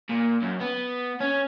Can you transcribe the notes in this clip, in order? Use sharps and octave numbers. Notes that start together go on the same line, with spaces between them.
A#2
F#2
B3
C#4